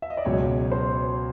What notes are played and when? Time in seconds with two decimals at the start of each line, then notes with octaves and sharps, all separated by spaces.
0.02 E5
0.10 D#5
0.17 D5
0.25 C#2 B2 F#3 C#5
0.72 C5